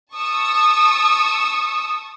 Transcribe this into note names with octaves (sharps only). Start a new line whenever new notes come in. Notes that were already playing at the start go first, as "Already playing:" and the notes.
A5 C#6 D#6 E6